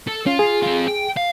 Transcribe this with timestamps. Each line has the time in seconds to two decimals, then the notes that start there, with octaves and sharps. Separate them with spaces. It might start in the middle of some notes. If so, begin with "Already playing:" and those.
0.07 A4
0.26 C#4 F4
0.39 G#4
0.62 C4 F4
0.88 G5
1.17 F5